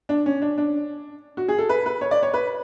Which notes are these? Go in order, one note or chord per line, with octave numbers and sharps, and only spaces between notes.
D4
C#4
D4
D4
F#4
G#4
A4
B4
B4
C#5
D5
C#5
B4